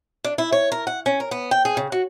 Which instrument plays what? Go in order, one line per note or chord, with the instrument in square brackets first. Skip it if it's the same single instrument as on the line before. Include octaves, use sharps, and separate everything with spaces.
[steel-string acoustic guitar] D4
E4
C#5
A#4
F#5
C#4
A#4
B3
G5
G#4
C#3
F#4